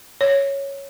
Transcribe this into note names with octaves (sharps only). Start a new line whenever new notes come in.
C#5